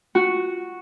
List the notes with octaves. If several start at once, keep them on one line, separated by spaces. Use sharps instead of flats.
F#4